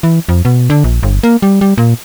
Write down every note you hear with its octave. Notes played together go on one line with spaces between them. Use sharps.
E3
F2
B2
D3
A#1
G1
A#3
G3
G3
A#2